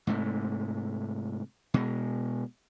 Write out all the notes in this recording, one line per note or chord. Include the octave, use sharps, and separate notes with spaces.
G#2 C3 A3
B2 G#3